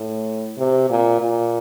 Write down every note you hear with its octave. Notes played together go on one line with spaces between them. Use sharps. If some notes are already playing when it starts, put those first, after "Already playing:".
Already playing: A2
C3
A#2
A#2